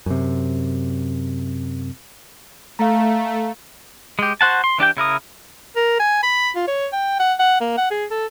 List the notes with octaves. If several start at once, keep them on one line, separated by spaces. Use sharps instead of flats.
F#2 C3
A3 F5 A#5
G#3 G4
F#4 C5 F#5 A5
C6
E3 D4 G4 G5
C#3 E4 A#4 D#6
A#4
G#5
B5
F4
C#5
G5
F#5
F#5
A#3
F#5
G#4
A4